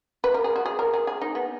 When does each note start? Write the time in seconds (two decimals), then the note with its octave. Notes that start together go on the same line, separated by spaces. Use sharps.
0.24 B4
0.34 A#4
0.44 G#4
0.56 F#4
0.66 G#4
0.79 A#4
0.94 G#4
1.07 G#4
1.21 D#4
1.35 B3